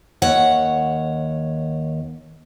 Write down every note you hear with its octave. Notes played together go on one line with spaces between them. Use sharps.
D#2 C#5 F#5